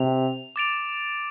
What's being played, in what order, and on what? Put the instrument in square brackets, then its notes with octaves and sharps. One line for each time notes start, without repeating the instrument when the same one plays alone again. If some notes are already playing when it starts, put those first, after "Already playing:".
Already playing: [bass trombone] C3 [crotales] F7
[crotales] D6 A6 D7 F7